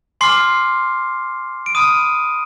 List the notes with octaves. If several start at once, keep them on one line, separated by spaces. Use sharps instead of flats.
G#5 C6 D6 F6 C7
D7
B5 D#6 F6 D#7